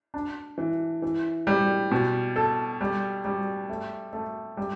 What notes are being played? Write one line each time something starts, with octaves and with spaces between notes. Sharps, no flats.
D4
E3
E3
G3
B2
A4
G3
G3
A3
A3
G3